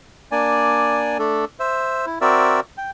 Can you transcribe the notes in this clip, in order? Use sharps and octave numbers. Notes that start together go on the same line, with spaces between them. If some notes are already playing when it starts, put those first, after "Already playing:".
A#3 D4 D5 G#5
A3 D4 A4
C5 E5
E4
C4 F#4 A#4 D5 E5
G5